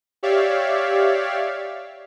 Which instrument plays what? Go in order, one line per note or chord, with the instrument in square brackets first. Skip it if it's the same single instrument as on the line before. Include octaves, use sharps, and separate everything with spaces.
[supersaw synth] G4 C#5 D5 E5 F5